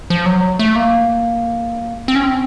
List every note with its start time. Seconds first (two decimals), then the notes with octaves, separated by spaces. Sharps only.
0.10 F3
0.26 F#3
0.59 A3
0.75 A#3
2.08 C4
2.15 C#4
2.23 C4